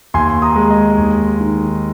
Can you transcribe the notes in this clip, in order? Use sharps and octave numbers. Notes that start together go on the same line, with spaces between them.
D#2 G#5 C6
A#5 D#6
G#3
D#5
D#2
D#3